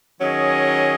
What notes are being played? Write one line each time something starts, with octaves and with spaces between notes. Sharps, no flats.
D#3 F#3 C#4 G#4 D#5